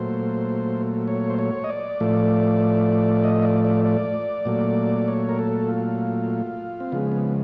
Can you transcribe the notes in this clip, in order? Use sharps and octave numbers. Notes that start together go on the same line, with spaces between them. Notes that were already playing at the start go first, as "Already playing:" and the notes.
Already playing: A#2 F#3 A3 C5
C#5
C5
C#5
D#5
D5
A2 F3 A3
D#5
D5
D5
D5
A#2 F#3 A3
C#5
A#4
A4
F4
C4
C#3 F3 G#3 B3
B3